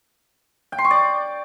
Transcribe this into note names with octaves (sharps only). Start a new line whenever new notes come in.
G5
C6
C#6
D5